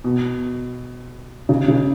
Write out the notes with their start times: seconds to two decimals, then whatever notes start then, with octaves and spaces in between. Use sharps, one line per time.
0.04 B2
1.49 C#3
1.68 C#3